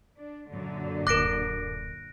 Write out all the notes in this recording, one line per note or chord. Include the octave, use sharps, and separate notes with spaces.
D4
F#2 A#2 D3
D1 A#4 D6 F#6 A#6 D7